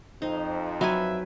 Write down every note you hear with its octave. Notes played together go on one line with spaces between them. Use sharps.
F2 D#4 C5
F#3 B4 E5 G5 G#5